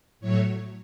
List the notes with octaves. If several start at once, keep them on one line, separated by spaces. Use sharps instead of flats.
A2 F#3 A3 C#5